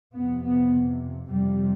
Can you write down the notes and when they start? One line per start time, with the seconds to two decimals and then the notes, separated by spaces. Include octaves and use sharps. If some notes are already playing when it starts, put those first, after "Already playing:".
0.14 F2 C3 B3
0.43 B3
1.28 F2 C3 G3